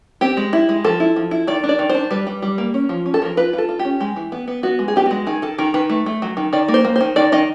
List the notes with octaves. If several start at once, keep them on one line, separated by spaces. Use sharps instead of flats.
C4 G4
G#3
E4
G#3
F3 A4
E4
F3
E4
D#3 D5
D4
D5
D#3
D4 C5
G3 B4
G3
G3
A#3
C#4
F3
C#4
A4
F3 A#4
F4 B4
F4
A4
F4
G4
C#4
G#3 G4
E3
B3
B3
B3 F#4
G#3
G#4
B3 G4
G#3 F#4
D#3 G#4
D#3 A4
D#3 A#4
D#3 B4
A3
A3
F#3
D#3
D#3 D5
A#3
C5
A#3
C5
D#3
D#3 D5
D#3 D#5